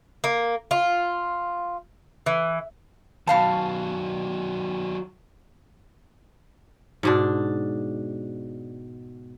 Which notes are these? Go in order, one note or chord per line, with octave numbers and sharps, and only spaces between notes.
A#3
F4
E3
B2 D#3 F#3 F5 A5
G#2 B2 D4